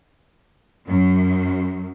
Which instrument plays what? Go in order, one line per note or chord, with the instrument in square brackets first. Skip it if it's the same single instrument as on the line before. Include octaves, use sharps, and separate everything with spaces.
[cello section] F#2